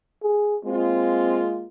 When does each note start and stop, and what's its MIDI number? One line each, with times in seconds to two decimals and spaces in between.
0.23 0.57 68
0.65 1.67 56
0.65 1.67 58
0.65 1.46 60
0.65 1.67 65